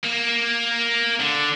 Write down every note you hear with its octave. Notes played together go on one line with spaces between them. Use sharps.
A#3
D3